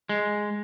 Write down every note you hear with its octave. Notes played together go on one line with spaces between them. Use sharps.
G#3